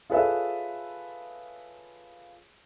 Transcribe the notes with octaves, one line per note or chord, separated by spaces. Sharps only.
F4 G#4 A4 B4 C#5 E5